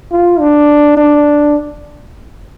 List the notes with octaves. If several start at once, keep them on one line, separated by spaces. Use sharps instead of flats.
F4
D4
D4